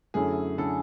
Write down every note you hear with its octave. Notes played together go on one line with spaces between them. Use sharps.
F#2 D3 A3 C#4 E4 G#4
D3 A3 C#4 E4 A4